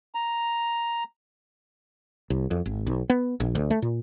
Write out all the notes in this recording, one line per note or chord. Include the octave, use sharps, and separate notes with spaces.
A#5
C2
F2
G#1
B1
B3
A#1
D2
A3
A#2